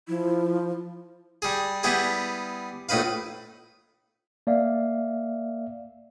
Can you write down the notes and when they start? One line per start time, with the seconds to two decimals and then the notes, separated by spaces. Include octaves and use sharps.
0.08 F3 E4
1.42 G3 G#4
1.83 G3 B3 E4 G4 G#4
2.89 A#1 A2 D#4 B4 F5
4.47 A#3 D5 E5 F5